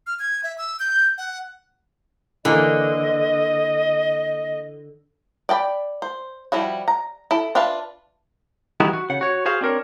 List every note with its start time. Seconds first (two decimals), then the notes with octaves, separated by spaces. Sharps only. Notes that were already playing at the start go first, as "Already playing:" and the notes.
0.07 F6
0.19 G#6
0.44 E5
0.58 E6
0.80 G6
1.18 F#5
2.45 D3 E3 A#3 D4 D#5
5.49 D5 G5 A5 B5
6.02 C5
6.52 F3 G3 E4 F#4
6.88 A#5
7.31 E4 A4
7.55 D4 F4 B4 E5 A5
8.80 E3 G3 B3 D#4 E4 F#4
8.93 F#4
9.10 C#3 F#5
9.21 F#4 C#5
9.46 F#4 G#4 C5 F5
9.61 C4 D4 A#4 C#5